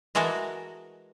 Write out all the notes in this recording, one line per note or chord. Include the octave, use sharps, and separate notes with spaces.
E3 G#3 F#4 A4 A#4